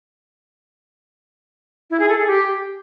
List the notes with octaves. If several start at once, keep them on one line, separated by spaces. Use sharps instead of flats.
E4
G#4
A4
G#4
G4